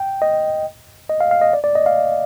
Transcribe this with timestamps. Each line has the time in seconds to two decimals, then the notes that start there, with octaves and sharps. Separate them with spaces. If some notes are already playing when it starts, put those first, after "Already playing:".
Already playing: G5
0.22 D#5
1.10 D#5
1.20 F5
1.31 F5
1.42 D#5
1.53 D5
1.64 D5
1.75 D#5
1.86 F5